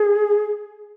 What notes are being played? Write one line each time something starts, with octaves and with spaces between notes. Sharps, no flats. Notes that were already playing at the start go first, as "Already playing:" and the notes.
Already playing: G#4